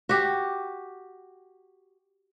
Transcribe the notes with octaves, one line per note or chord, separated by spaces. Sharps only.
F#4 G4